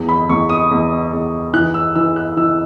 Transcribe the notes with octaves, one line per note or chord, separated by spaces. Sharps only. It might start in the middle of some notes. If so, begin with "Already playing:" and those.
Already playing: E2
B5
E2 C#6
D#6
E2
E2
E3 F#6
E6
E3 E6
F#6
E3 E6